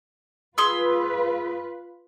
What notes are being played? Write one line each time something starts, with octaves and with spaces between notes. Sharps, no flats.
F4 G#4 B4 C6 E6